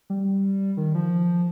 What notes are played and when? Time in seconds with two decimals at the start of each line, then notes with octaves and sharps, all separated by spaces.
0.10 G3
0.77 D#3
0.95 F3